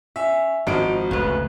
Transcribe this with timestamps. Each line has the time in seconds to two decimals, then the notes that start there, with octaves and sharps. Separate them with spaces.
0.16 C#4 E5
0.67 G#1 G#2 F3 D#4 F#4 D7
1.11 F1 C#2 C#3 A3 B4